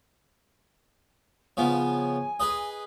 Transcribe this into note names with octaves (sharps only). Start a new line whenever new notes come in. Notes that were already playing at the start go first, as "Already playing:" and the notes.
C#3 F3 B3 G#5
G#4 B4 D#5